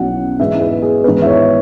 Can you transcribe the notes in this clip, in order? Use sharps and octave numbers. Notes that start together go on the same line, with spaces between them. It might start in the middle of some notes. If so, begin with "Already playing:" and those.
Already playing: B1 B2 F#3 C#4 E4 F#5
G#2 E3 G#3 B3 E5
B4
G#4
G#1 G#2 E3 G#3 B3 B4
E5
C#5